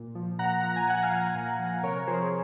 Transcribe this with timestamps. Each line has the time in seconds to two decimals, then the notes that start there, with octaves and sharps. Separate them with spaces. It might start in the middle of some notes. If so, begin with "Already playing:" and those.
Already playing: A#2
0.15 F3
0.39 A#2 F#5 A#5
0.63 F3 A#5
0.76 G#5
0.87 A#2 F#5
1.02 F5 G#5
1.12 F3
1.35 A#2
1.59 F3
1.83 C3 A#4 C#5
2.07 F3 G#4 C5